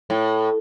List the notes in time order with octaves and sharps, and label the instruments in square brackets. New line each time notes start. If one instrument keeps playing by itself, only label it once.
[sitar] A2